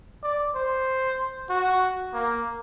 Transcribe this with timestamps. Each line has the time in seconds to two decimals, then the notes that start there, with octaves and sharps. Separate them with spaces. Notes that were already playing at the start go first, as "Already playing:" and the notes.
0.23 D5
0.55 C5
1.50 F#4
2.14 A#3